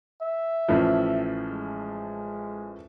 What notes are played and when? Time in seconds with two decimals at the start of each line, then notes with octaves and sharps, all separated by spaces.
0.22 E5
0.68 A1 A2 F3
1.50 G#3